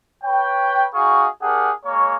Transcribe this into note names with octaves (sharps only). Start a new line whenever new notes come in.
B4 C#5 G5
D#4 F#4 G#4 F5 C#6
D4 G4 G#4 A#4 F#5
G#3 A#3 C#5